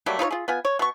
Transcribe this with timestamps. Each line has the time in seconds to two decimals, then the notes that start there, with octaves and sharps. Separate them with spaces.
0.06 F#3 G3 A3 A#3
0.19 D#4 F4 B4 C#5
0.31 F4 G#4
0.48 B3 F4 G#5
0.65 C#5
0.79 B2 C#6